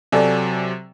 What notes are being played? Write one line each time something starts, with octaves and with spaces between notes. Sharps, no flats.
C3 F#3 A4 D5 G#5